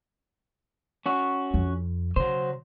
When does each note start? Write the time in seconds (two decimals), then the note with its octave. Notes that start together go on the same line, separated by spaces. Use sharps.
1.06 C#4 F#4
1.54 F2
2.16 C#3 F#3 C5